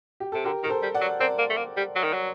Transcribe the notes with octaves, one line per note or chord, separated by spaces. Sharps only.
G4
C3 A4
D3 G4 A#4
D#3 A#4
A4 C5
G3
D5 F#5
F#3
C4 A#4 D5
A#3
A3
A#3
G3
F#3
D#3
F#3